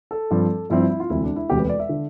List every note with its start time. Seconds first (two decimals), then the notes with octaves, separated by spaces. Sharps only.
0.11 A4
0.31 G2 F3 C4
0.70 G2 F3 C4 E4
0.80 E4
0.90 E4
1.00 F4
1.10 E1 D2 C3 E4
1.24 D4
1.36 E4
1.49 E1 D2 C3 G4
1.59 B4
1.69 D5
1.80 E5
1.89 D3